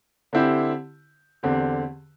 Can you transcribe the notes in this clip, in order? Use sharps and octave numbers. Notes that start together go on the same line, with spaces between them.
D3 C4 E4 G4
E2 D3 C4 G4